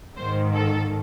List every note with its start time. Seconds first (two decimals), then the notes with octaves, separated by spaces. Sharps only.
0.17 G#2 D#3 C5
0.55 A4